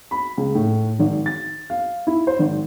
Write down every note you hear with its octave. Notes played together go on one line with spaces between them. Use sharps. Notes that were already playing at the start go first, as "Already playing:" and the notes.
B5
C#2
A2
G#1
A6
F5
E4
C5
G#1